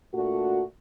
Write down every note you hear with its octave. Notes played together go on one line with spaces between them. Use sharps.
A#2 A3 D4 F#4